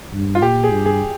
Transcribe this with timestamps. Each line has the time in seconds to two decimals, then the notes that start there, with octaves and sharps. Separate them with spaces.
0.13 G2
0.35 F4
0.42 A#2 G4
0.64 G#4
0.71 G2
0.86 G#4